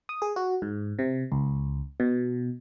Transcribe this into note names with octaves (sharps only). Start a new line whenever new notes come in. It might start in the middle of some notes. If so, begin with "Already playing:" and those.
D#6
G#4
F#4
G#2
C3
C#2
B2